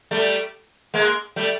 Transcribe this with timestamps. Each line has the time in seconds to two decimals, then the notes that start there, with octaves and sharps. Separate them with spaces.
0.11 G3 A3
0.94 G#3 A#3
1.36 G3 A3